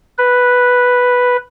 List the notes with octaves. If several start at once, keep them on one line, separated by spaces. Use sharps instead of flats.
B4